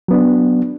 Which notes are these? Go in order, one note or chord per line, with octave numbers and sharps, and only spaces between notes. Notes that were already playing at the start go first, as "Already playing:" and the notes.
F#3 B3 D4